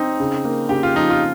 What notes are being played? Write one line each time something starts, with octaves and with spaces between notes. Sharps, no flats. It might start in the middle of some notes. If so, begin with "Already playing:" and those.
Already playing: C4 D#4
C#3
A#3
C#3 G4
F4
F3 D#4
F4